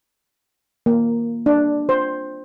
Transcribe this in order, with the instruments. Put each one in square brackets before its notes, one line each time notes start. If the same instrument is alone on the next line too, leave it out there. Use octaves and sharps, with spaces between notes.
[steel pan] A#3
D4
C5